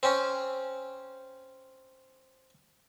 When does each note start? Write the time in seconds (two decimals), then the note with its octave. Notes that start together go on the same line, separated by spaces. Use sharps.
0.03 C4 C#4